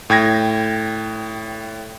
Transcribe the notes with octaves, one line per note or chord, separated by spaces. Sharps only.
A2 G5 G#6 A#6